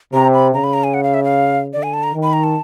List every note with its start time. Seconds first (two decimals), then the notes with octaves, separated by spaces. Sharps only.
0.13 C3 A#5
0.34 B5
0.53 C#3 A#5
0.64 B5
0.74 A#5
0.84 G#5
0.94 F#5
1.03 F5
1.14 E5
1.24 F5
1.73 D3 D5
1.83 G#5
1.94 A5
2.03 A#5
2.14 D#3
2.23 B5
2.33 A#5
2.44 A5